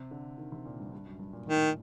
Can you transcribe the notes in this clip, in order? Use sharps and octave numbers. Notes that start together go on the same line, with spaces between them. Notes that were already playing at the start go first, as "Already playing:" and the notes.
Already playing: C3
D3
D#3
C3
A#2
G2
G2
F#2
G2
A#2
A2 D#3